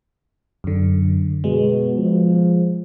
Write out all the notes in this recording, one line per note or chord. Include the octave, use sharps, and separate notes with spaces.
F#2 D3
B2 G#3
F3